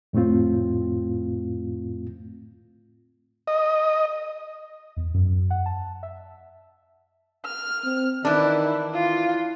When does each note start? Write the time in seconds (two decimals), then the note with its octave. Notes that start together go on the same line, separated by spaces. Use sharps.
0.13 F2 A2 A3 C4 F4
3.48 D#5
4.97 E2
5.14 F#2
5.50 F#5
5.66 A5
6.03 E5
7.45 F6
7.84 C4
8.25 D#3 E3 D4 E4
8.94 E4 F4